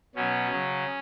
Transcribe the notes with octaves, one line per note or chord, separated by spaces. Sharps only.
B2 F#3 C#4
C#3 F#3